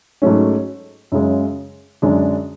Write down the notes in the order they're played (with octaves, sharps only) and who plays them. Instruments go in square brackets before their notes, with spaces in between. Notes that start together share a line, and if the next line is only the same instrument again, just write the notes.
[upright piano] G#2 F#3 A3 C#4
F#2 C#3 G#3
F#2 D3 G#3 D4